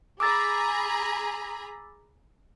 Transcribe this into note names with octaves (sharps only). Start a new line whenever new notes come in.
G#4 A#5 B5 D6 E6 A6